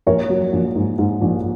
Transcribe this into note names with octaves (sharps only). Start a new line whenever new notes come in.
A#1 A#4 C#5
F#3
A#1
G#2
G#2
A#1